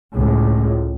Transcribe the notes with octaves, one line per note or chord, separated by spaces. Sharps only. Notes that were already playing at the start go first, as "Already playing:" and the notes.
C#2 A2